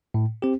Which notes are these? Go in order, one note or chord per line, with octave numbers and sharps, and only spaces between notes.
A2
C4 G4